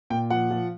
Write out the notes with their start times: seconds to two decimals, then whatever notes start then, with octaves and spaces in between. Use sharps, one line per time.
0.10 A#2 G5
0.30 F3 F#5
0.51 F3